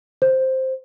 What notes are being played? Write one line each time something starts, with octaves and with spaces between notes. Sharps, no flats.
C5